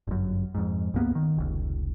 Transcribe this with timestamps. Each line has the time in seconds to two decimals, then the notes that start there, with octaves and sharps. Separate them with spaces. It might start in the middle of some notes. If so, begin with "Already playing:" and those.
0.07 G1 F#2
0.55 F2 G#2
0.94 C#2 G2 A#3 B3
1.15 D#3
1.38 F1 C#2